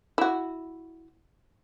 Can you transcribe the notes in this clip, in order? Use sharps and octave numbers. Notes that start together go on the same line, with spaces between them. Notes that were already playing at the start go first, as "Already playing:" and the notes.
E4 F#4